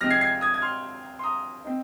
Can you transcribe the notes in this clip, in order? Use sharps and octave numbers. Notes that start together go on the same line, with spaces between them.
C3 F3 G#3 C4 D#4 F6 A#6
G#6 C7
G#6 C7
D#6 G#6
G#6
C6 F6
C6
A#5 D#6
C4 D#4